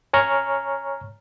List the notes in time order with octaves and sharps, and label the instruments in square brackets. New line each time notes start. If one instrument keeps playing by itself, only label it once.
[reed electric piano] C#5 G#5 A#5 C#6 F6